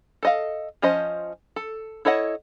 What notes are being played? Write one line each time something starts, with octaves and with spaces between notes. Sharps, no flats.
A4 D#5 F5
F3 C#4 C5 D#5
A4
E4 A4 C#5 D#5 F#5